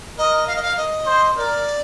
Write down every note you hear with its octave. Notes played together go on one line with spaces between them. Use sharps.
A#4 D#5
F5
D#5
F5
D#5
C5
A#4 D5